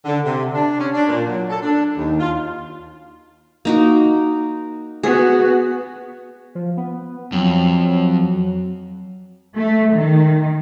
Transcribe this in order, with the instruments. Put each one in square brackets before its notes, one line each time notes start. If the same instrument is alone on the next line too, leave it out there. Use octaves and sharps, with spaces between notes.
[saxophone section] D3
C3
D4
C#4
D4
A#2
F#3
A4
D4
D#2
F4
[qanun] A#3 D#4 F#4
[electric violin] B3 F#4 [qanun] G#4
[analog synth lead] F3
B3
[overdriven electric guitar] F2 [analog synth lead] F#3
[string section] A3
D#3